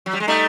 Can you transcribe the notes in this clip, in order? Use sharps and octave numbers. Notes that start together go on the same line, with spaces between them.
F#3
G3
G#3
G3 A3 D#4